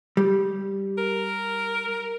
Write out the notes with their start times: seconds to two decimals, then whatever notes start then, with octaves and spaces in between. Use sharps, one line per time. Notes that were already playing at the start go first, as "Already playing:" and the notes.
0.17 G3
0.98 A#4